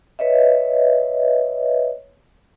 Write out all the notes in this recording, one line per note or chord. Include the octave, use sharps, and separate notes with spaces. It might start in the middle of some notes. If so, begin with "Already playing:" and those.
B4 C#5 D#5 E5